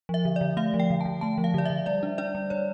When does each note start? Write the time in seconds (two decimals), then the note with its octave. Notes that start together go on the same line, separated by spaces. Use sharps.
0.09 F3 E5
0.25 D3
0.36 D3 D5
0.57 A3 F5
0.74 F3
0.80 G5
0.90 D3
1.01 D3 A5
1.21 A3 A5
1.38 F3
1.44 F5
1.54 D3 D5
1.65 D3 E5
1.86 G3 D5
2.03 D4
2.18 D4 D5
2.35 G3
2.50 G3 C#5